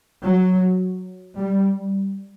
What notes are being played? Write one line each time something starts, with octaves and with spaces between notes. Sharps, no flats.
F#3
G3